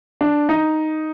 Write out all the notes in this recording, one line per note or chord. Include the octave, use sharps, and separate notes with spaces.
D4
D#4